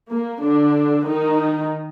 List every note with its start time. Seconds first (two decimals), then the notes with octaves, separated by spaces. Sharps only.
0.09 A#3
0.42 D3 D4
1.07 D#3 D#4